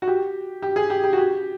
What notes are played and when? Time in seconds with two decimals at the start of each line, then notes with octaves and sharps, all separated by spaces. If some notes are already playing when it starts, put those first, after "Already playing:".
0.02 F#4
0.08 G4
0.62 G4
0.76 G#4
0.90 G4
1.04 G4
1.13 F#4
1.17 G4